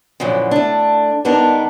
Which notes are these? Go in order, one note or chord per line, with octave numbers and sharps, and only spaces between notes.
F#2 A#2 D3 E3 F3
A3 D4
G2 B3 D4 D#4 A#4 A5